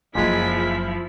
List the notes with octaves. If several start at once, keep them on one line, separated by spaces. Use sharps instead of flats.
F#1 F#2 A#2 F3 G#3 E4 B6